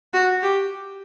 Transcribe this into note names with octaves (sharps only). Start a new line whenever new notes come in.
F#4
G4